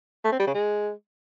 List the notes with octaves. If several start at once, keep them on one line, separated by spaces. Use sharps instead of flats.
A3
C4
G3
C#3
G#3